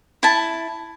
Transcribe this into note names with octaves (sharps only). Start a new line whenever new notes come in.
E4 A5